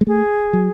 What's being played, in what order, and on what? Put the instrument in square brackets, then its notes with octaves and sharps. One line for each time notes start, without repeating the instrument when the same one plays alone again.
[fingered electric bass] G#3
[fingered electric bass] A3 [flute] G#4
[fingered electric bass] F#3